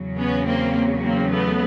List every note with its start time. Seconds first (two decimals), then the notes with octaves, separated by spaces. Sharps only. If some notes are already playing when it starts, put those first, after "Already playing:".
Already playing: E2 C#3 F#3
0.17 B3 C#4
0.45 A#3 C4
1.03 A#3 C4
1.31 A3 B3